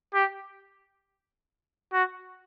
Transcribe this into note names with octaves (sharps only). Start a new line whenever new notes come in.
G4
F#4